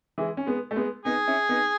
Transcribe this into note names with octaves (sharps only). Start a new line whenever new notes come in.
E3 G#3
C#4
G#3 B3
A3
G#3 B3
B3 D#4 G#4
C#4 E4
B3 D#4